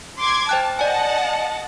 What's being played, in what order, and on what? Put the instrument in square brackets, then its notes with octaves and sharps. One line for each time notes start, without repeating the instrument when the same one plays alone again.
[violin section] C6 D6 G#6
[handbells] C5 G5 F#6 [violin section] A5
[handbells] D5 G#5 [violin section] D#5 F#5 A5